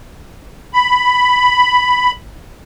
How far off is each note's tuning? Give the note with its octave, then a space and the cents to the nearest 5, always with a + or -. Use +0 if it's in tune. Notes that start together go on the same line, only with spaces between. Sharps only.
B5 +5